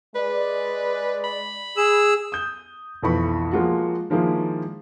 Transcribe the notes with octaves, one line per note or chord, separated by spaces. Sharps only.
G#3 B4 D5
B5
G#4 E6
D#6 G6
B1 F2 E3 B4 B5 C#6
F3 G#3 A#3 F4 F#4
D#3 F3 G#3 A#3 E4